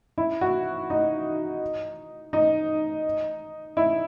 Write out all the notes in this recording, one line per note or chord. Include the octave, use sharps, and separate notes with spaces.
E4
F#4
D#4
D#4
E4